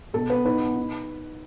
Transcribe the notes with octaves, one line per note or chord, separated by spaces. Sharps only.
B2 A4
B3 B4
D#4 B4
B3
D#4